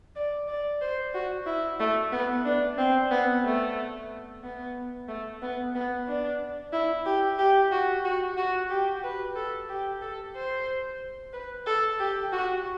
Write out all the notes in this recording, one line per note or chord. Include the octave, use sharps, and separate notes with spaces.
D5
D5
C5
F#4
E4
A3
B3
D4
C4
B3
A3
B3
A3
B3
B3
D4
E4
G4
G4
F#4
F#4
F#4
G4
B4
A4
G4
A4
C5
B4
A4
G4
F#4